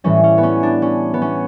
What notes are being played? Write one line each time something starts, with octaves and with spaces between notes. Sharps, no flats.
A2 E3 G3 C#4
C#4
B3
C#4
D4
C#4
B3
C#4